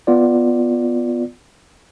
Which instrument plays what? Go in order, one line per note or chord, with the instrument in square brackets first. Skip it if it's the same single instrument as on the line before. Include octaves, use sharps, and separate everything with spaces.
[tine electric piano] B3 F4 D5